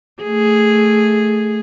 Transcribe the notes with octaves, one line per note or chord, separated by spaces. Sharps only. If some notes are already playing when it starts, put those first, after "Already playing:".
A3 G#4